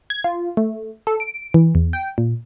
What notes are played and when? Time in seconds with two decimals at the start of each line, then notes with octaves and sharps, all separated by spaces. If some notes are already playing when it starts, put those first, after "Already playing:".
0.10 G#6
0.24 F4
0.57 A3
1.07 A4
1.20 D7
1.54 E3
1.75 E2
1.93 G5
2.18 A#2